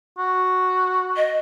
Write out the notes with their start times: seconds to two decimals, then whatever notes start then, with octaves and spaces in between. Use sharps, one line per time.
0.18 F#4
1.16 D#5